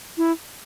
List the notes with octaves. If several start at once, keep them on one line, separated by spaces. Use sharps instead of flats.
E4